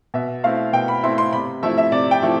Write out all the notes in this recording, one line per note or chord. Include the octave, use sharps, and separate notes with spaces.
B2 E5
A3 C4 E4 F5
B2 G5
B5
A3 C4 E4 C6
C6
C3 B5
F3 A3 E4 E5
E5
C3 D5
G5
F3 A3 E4